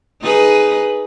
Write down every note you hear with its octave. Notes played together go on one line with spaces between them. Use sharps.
D#4 G#4 B4